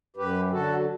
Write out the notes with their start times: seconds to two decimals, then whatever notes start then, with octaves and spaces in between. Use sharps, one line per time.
0.16 F#2 G4 B4
0.51 D3 F#3 F#4 A4